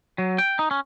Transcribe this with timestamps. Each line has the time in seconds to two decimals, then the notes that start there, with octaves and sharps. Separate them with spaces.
0.18 F#3
0.38 G5
0.59 D#4
0.71 C#4